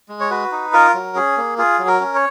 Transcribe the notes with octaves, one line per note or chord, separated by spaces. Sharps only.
G#3
C#5
F#4 B4
D#4
F4 A#4
F#3
C#4 G#4
A#3
F4 G#4
F#3
A#4
C#4
C#5